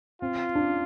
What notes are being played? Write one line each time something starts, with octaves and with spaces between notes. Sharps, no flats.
C4 F4
D4